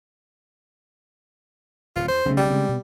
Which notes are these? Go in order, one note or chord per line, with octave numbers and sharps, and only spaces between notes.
D1 C#3 F4
E2 C5
B1 C#3 A3
G3
G#3 B3 C4
B2 B3